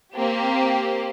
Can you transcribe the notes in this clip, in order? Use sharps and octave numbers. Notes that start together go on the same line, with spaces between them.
A#3 C4 G4